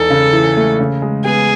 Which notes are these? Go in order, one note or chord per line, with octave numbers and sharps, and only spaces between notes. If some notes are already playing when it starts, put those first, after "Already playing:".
Already playing: E2 D#4 A4
C#3
E3
A3
C#3
G#3
B3 G#4